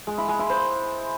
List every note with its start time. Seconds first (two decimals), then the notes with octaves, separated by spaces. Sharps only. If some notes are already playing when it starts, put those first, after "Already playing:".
0.07 G#3
0.18 E4
0.28 G#3
0.39 E4
0.50 C5